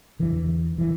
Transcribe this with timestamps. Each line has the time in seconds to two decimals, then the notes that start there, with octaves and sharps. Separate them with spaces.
0.19 E2 D3 E3
0.78 E3